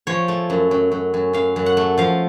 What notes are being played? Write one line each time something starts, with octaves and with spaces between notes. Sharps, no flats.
F3 C#5
A3
F#2
F#2
F#2
F#2
F#2 F5
F#2
F#5
A3
F3 F5